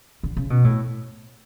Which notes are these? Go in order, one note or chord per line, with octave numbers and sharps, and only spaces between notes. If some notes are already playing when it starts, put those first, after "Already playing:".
D3
C#3
B2
A2